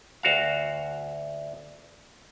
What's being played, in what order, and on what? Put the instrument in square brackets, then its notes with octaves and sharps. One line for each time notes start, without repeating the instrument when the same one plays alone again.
[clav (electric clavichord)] D2 F#4 F5